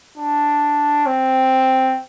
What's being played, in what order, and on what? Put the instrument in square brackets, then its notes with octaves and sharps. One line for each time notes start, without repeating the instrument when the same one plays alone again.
[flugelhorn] D4
C4